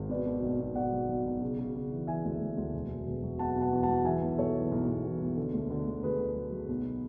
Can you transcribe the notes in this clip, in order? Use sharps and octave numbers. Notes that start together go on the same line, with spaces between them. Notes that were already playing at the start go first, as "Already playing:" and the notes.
Already playing: G#1
B2 B4 D5
B2
B1
B2
B2 D5 F#5
F#3
B1
B1
C#3
C#3
C#3
E3
E3 E5 G#5
D2
D2
D2
E1
F#3
E1
F#3
B2 F#5 A5
B2
F#5 A5
E2
F#5 A5
F#3
E3 E5 G#5
B1
B1 A4 C#5
E3
B1
B1
E3
B1
D3
D2
D3
D2
D2 G#4 B4
D3
F#3
F#3
B1